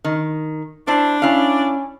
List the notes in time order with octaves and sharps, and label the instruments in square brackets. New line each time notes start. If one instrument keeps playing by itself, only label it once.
[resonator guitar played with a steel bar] D#3
[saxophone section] D4 [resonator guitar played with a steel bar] E4 C5 A5
[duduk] C#4 [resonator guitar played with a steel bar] E4 F5